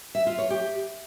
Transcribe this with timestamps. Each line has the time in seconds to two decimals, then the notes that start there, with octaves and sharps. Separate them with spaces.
0.15 E5
0.27 F4
0.38 C#5
0.50 G4